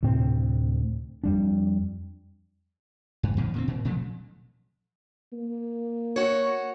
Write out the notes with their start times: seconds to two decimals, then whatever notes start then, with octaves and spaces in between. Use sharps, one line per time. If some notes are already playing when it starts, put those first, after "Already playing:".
0.03 D2 A2 C3 C4
1.24 F2 G3 D4
3.23 G2
3.37 F2 B2 D#3
3.54 A#2 D3 C4
3.68 A#2
3.85 A#2 F3 F#3 A3
5.33 A#3
6.16 F#4 C#5